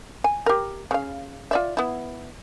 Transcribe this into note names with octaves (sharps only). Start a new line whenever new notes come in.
G#5
G4 A#4
C#3 F5
F4 D5 E5
B3 E4